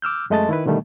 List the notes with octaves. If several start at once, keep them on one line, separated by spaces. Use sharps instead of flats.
D6 E6 F6 G6
F#2 G#3 A3 D#5 A5 A6
D#3 E4 B4
B2 D3 D#3 G3 A3